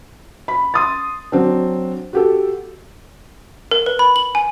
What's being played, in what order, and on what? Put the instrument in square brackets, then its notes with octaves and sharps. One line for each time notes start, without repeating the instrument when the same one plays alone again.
[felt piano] B5
C6 D#6 A6
F#3 C4 D4
F#4 G4 A4
[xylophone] A#4
B4
B5
F#7
G#5